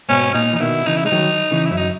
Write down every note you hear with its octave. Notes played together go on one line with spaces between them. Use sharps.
G#2 B2 C#4
A#2 D#4
E3
D#4
B2 D#3 E4
C#3 E3 D#4
E4
G#3 D#4
D#3 F#3
C#3 E3
E4
F#2
D#4